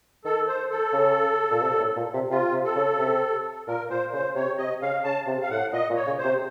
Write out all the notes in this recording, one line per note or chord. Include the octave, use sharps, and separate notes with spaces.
D#3 A4
C5
A4
C#3
A#2
C3
A2
A#2
C3
C3 F4
C3
A4
C#3
C3
A#2 A#4
A#2 C5
C#3 C5
C3 C#5
C3 D#5
C#3 F5
C#3 A5
C3
F5
A2 F#5
A#2 D#5
A#2
C#5
C#3
C5
C3